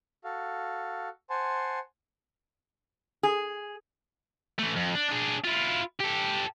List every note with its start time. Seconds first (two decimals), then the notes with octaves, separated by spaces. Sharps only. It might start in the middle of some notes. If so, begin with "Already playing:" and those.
0.24 F#4 A4 F5
1.30 C5 F#5 G#5 A5 C6
3.23 G#4
4.59 E3 A3
4.75 F2
4.95 D4
5.09 D4 G#4
5.44 E4 F4
6.00 G4 A4